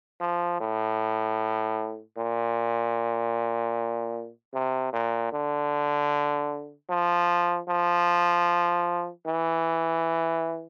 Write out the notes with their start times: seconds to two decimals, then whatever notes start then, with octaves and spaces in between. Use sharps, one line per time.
0.21 F3
0.61 A2
2.18 A#2
4.54 C3
4.93 A#2
5.33 D3
6.90 F3
7.68 F3
9.26 E3